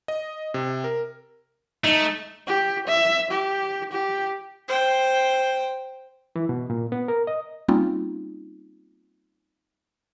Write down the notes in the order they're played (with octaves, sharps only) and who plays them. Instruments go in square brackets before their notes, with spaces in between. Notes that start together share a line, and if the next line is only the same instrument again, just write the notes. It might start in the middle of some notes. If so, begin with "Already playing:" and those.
[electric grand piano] D#5
C3
A#4
[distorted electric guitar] A3 [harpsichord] D#4
[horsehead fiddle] G4
E5
G4
G4
[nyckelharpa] C5 G5
[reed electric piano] E3
B2
A#2
B3
A#4
D#5
[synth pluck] G3 A#3 C4 C#4 D#4 F4